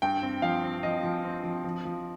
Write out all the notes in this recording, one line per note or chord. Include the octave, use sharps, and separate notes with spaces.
G2 G5
C4
F3 F5
C4
F3 D#5
F3
C4
F3
F3
F3